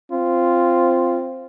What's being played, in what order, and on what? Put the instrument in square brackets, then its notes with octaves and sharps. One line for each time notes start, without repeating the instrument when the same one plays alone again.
[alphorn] C4 [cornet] F4